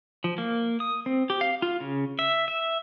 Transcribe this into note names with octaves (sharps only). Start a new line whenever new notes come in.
F3
A#3
D#6
C4
G4
F5
F4
C#3
E5
E5